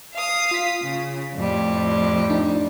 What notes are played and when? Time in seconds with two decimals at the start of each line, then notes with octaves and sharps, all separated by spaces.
0.15 F5 D#6
0.51 F4 B6
0.84 C#3
1.35 F2 A2 G3
2.30 D4 D#4